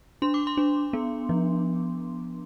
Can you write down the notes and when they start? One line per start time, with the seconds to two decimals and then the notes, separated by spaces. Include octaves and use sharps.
0.22 D4 C6
0.34 D6
0.47 C6
0.57 D4
0.93 B3
1.29 F3